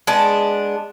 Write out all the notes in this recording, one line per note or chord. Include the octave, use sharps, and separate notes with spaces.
G#3 B3 D4 A5